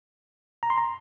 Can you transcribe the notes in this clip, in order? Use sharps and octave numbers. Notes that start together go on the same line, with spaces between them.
A#5
C6
A#5